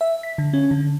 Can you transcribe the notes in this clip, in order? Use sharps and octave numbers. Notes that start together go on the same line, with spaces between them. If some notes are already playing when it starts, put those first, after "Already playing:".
E5
B6
D3
C#4
D3